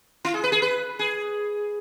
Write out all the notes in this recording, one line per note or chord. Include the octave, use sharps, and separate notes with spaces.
E4
G#4
B4
G#4
B4
G#4